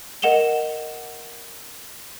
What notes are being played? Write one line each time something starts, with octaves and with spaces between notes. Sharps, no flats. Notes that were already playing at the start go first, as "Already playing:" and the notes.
A#4 D#5 F#5 E7 F7 G7